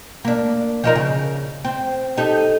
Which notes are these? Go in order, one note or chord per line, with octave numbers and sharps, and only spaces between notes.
A#3 D4
F3 D#4 A#4
C#3
C4
D#4 G4 A4